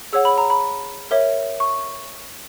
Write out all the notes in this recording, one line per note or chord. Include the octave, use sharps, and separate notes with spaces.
G#4 C#5 F#5 E6
B5
A#5
B5
A#4 C#5 E5
C#6